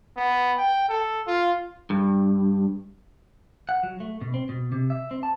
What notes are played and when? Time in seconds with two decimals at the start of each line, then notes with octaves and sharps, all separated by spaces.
0.17 B3
0.57 G5
0.89 A4
1.27 F4
1.90 G2
3.69 F#5
3.83 F#3
4.00 A3
4.21 B2
4.34 C4
4.49 B2
4.72 C3
4.90 E5
5.11 C4
5.23 A5